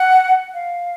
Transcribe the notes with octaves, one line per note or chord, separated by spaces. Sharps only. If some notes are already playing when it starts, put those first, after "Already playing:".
Already playing: F#5
F5